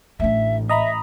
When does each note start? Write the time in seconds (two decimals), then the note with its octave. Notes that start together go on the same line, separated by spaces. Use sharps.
0.20 A1 A3 D4 E5
0.69 D#5 E5 A#5 B5